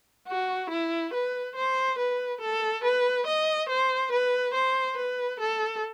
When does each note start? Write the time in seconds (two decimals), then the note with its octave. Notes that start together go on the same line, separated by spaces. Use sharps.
0.28 F#4
0.70 E4
1.14 B4
1.56 C5
1.99 B4
2.41 A4
2.84 B4
3.27 D#5
3.69 C5
4.12 B4
4.54 C5
4.97 B4
5.40 A4